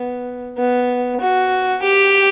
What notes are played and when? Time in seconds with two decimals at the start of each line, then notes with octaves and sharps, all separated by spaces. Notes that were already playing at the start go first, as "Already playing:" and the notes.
Already playing: B3
0.58 B3
1.21 F#4
1.83 G4